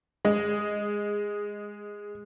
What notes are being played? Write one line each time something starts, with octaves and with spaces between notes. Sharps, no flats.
G#3 D#5